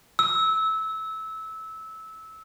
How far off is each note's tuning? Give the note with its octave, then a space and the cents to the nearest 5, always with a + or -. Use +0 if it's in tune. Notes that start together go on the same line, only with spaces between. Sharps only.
E6 -20